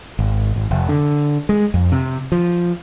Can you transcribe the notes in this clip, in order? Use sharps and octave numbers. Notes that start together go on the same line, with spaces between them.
G#1
G#1
F1
D3
G#3
F2
C3
F3